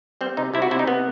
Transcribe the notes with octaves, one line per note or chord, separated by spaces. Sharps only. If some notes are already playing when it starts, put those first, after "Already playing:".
G3 C4
C3 D#4
C3 E4
F#4
C3 E4
D#4
C3 B3